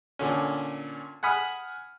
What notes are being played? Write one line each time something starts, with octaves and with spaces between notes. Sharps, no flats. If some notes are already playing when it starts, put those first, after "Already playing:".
A#2 D3 C#4
F#5 G#5 B5 D#6 F6